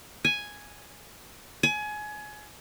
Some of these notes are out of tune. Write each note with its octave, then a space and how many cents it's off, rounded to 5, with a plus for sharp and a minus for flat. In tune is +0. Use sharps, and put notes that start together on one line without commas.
G#5 +0
G#5 +25